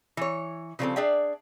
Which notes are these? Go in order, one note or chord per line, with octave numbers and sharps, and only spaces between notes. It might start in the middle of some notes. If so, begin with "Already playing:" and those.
E3 C#5
C#3 F3 G3 G#3 C4 A4
D4 G#4 D5 E5 G5